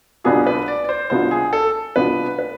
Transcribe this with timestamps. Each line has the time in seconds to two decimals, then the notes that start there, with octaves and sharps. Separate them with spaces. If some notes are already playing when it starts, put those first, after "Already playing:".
0.24 C2 B2 B3 D4 F4 G#4
0.47 B4
0.68 D5
0.84 D5
0.89 C5
1.10 C2 B2 B3 D4 F4 C5
1.31 G#4
1.53 A4
1.96 C2 B2 B3 D4 F4 B4
2.39 B4